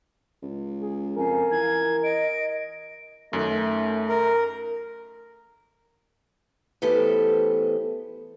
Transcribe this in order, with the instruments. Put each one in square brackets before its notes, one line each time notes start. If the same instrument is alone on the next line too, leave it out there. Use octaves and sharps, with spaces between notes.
[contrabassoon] C#2
[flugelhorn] G#4
[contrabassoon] F2 [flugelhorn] A#4 [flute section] F5 G#5
[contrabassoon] E3 [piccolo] G#6
[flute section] D#5 [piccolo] D7
[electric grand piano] F#2 D#3 [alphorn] A3
[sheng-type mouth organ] A#4
[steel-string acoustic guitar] E3 A3 B3 G4 A4 C5